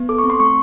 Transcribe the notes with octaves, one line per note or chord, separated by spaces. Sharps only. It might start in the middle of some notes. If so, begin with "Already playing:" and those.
Already playing: B3
A4 D6
C#6
C4
C6
A3 C#6